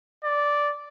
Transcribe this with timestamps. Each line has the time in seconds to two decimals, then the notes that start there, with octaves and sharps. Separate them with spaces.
0.24 D5